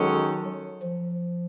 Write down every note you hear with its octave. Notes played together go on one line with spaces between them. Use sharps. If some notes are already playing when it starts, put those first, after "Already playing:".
Already playing: D#3 F#3 G#3 C#4 F#4 A4
F3